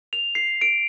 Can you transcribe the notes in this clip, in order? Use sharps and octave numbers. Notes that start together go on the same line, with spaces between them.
F7
C7
D7